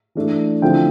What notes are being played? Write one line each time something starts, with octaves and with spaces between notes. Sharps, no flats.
E3 A3 D4
D3 F3 A3 C4 E4 G5